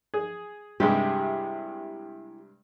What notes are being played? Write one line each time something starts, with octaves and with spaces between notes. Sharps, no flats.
G#4
G2 C3 G#3 E4 G4